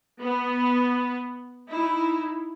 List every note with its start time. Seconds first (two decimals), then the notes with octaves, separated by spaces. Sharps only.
0.19 B3
1.69 D#4 E4